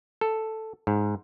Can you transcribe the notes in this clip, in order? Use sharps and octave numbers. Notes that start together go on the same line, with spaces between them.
A4
G#2